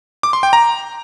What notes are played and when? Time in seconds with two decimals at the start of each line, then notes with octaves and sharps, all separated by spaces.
0.23 D6
0.33 C6
0.43 G5
0.53 A#5